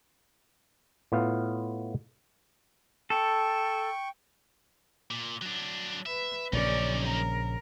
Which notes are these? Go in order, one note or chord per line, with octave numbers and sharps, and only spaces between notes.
A2 B3 F4 F5
A4 G5 C#6
A#2
F#3 D4
B4 E5
A#1 C#3 F#3 C#4 D#4 D5
A#4